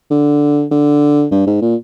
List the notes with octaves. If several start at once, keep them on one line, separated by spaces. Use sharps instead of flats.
D3
D3
G2
G#2
A#2